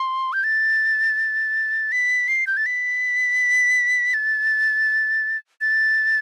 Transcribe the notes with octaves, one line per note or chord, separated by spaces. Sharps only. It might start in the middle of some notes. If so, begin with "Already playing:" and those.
Already playing: C6
G6
A6
B6
C7
G6
A6
B6
A6
A6